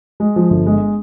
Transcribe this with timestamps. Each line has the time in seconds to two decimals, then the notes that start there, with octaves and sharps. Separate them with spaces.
0.20 G#3
0.36 F3
0.50 G1
0.66 G#3